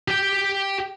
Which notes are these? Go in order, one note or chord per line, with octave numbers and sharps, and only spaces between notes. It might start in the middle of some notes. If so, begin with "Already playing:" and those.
G4 G5